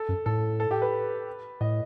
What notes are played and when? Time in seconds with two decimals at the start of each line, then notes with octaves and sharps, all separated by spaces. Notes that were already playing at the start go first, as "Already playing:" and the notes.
Already playing: A4
0.09 F#2
0.26 A2 A4
0.60 A4
0.71 G4
0.82 B4
1.61 A2 D#5